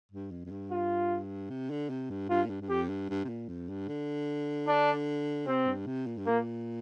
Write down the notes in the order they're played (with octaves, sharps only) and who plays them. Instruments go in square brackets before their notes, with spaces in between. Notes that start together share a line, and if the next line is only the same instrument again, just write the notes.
[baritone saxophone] G2
F2
F2
G2
[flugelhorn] F4
[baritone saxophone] C3
D3
C3
G2
[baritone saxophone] G2 [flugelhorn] F4
[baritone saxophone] A#2
G2
G2
[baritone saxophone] F2 [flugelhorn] G4
[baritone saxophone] G2
G2
C3
A#2
F2
G2
D3
[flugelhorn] D4
[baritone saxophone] C3 [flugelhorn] C4
[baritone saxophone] G2
C3
A#2
G2
[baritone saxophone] A#2 [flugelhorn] A#3